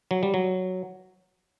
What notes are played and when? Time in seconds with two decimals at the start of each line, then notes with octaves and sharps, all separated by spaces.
0.11 F#3
0.23 G3
0.34 F#3